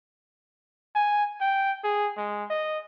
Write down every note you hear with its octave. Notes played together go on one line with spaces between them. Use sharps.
G#5
G5
G#4
G#3
D#5